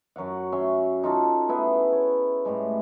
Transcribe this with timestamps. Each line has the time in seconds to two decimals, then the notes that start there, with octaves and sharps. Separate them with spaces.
0.16 F#2 F#3 F5 F#5
0.52 C#4 E5 C6
1.03 D#4 F4 A4
1.49 B3 E4 G#4
1.93 C#5
2.45 A2 G3 G#3